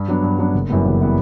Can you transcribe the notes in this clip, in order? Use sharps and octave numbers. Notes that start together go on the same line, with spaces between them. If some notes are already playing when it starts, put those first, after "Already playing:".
Already playing: G2
F#3 B3 D4
G2
F#3 B3 D4
F#1
F#2 E3 G3 B3
F#1
E3 G3 B3